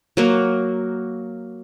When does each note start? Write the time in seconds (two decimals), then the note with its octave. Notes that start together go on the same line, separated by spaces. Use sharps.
0.17 F#3 A#3 F#4